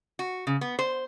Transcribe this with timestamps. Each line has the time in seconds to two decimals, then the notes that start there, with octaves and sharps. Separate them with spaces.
0.19 F#4
0.47 C#3
0.61 B3
0.79 C5